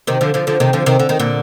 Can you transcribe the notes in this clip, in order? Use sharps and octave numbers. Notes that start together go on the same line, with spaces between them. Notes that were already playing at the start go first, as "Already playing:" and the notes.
C3 D#3
D3 F3
D3 F3
D3 F3
C3 D#3
D3 F3
C3 D#3
D3
D#3
A#2 D3